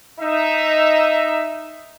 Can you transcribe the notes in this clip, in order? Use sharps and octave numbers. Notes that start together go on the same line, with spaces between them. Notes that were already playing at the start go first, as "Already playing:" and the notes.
D#4 E5